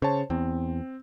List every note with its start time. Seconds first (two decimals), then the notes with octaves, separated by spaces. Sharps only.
0.02 C#3 C5 C#5 A5
0.30 E2 C4